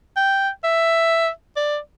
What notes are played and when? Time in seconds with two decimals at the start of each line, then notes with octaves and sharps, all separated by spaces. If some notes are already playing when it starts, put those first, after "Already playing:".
0.17 G5
0.64 E5
1.57 D5